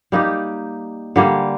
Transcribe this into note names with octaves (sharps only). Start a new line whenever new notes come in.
G3 A#3 D#4 G4
D3 G3 A#3